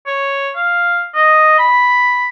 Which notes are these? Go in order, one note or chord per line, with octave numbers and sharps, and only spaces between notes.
C#5
F5
D#5
B5